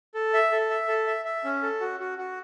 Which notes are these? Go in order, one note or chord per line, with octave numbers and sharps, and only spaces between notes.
A4
E5
A4
E5
A4
E5
E5
C#4
A4
F#4
F#4
F#4